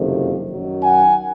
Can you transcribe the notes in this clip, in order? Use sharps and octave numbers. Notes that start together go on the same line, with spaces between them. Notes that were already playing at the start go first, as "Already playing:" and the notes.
Already playing: F#1 F2 C3 D#3
F#2 D#3 F#3
F#5 G#5